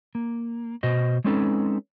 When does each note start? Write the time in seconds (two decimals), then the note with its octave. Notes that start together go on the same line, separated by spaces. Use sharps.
0.15 A#3
0.83 B2 F#4 C5 D#5
1.24 G#3 C4 C#4 D#4 A4 B4